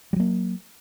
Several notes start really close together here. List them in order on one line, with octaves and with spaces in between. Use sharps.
G3 F#3 A#3